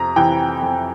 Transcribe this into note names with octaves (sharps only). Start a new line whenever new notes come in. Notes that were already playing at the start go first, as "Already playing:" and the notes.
Already playing: F2 C3 A#5
C3 E3 G5
F2